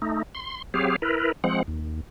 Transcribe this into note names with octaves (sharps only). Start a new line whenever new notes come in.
A3 D#4
C6
F#3 C4 G4 G#4 F5
E4 A#4 B4
F3 G#3 C4 F#5
D#2